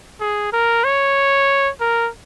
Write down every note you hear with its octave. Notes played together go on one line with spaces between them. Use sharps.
G#4
A#4
C#5
A#4